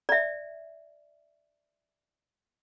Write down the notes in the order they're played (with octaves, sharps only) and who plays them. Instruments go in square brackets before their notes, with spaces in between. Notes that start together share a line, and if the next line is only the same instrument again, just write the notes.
[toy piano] D5 E5